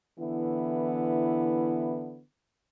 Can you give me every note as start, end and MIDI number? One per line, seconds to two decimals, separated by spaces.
0.19 2.20 50
0.19 2.20 52
0.19 2.20 59
0.19 2.20 64